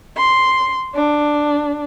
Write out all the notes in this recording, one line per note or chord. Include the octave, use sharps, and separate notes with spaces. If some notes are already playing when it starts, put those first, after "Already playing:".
C6
D4